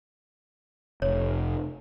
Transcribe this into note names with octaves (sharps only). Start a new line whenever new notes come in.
F1 C#5